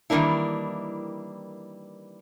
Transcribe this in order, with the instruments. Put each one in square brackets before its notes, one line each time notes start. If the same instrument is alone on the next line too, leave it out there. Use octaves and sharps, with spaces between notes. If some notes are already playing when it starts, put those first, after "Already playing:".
[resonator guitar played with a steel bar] D#3 E3 G3 A#3 D4 E4